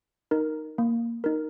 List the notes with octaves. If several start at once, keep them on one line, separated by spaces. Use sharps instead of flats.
D#4 A#4
A#3
D#4 A#4